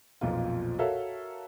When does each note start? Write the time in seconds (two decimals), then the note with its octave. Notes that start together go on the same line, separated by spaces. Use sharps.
0.21 B1 F2 A#2 F4
0.79 F#4 A4 A#4 C#5 E5 F5